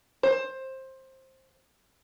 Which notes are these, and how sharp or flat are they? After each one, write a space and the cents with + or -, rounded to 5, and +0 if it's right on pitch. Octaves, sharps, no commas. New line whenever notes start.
C5 +15